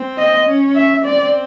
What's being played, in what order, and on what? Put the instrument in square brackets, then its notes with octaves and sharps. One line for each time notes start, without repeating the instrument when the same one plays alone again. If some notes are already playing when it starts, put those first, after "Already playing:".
Already playing: [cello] C4
[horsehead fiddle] D#5
[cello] C#4
[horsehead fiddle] E5
[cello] C4 [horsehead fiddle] D5